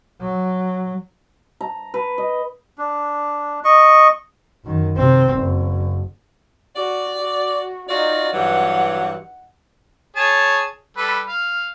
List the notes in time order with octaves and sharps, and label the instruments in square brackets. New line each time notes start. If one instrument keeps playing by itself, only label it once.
[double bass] F#3
[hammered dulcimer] A#5
B4
D#5
[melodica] D4
D#5 C#6
[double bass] F#2 D#3
C3 C4
F#1
[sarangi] F#4 [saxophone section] D5
[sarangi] F#4
[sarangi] D#4 [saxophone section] F4 F#4 D5
[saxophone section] G2 E3 F#3 [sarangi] F#5
[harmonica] G#4 C#5 A5
G3 A4 B4
F5